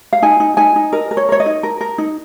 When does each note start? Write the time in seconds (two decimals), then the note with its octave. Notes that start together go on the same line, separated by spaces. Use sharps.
0.13 F5
0.22 D#4 G#5
0.40 D#4
0.57 D#4 G#5
0.76 D#4
0.93 A#4 D#5
1.11 A#4
1.17 C#5
1.29 A#4 C#5
1.40 D#5
1.46 D#4
1.63 A#4
1.81 A#4
1.98 D#4